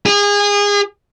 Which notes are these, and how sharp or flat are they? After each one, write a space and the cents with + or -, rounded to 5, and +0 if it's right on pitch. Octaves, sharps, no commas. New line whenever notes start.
G#4 -30